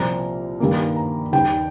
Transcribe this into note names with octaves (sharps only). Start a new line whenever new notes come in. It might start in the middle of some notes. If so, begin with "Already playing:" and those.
Already playing: C2 A#2 F3 C4 A#5
G2 D#3 A#3
A#5
D#2 D#3 G3 G5